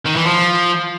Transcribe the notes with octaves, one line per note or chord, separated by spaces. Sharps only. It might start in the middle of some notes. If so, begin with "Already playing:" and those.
D#3
E3
F3